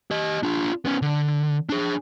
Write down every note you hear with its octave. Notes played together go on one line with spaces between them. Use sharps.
G4 D#5
D4 F4
B3 C#4
D3
D4 G#4